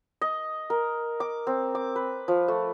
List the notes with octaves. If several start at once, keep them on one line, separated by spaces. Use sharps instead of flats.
D#5
A#4
D6
C4
D6
B4
F3
A3